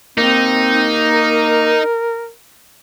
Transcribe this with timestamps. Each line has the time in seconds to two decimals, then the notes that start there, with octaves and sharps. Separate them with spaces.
0.18 A#3 C4 D#4
1.09 A#4